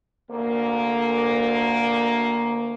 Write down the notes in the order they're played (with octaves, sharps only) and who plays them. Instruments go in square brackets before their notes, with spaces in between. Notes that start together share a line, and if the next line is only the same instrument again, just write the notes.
[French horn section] D2 A#3